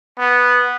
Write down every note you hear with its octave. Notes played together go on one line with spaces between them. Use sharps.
B3